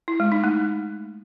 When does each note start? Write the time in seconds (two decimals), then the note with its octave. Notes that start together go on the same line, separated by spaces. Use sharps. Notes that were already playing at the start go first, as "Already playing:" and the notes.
0.08 E4
0.20 G#3
0.32 D#4
0.44 A3